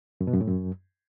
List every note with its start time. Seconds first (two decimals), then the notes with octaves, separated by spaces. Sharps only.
0.21 F#2
0.27 B2
0.34 F#2
0.41 A2
0.47 F#2